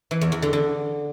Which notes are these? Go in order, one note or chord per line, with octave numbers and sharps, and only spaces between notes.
E3
E2
E2
D3
D3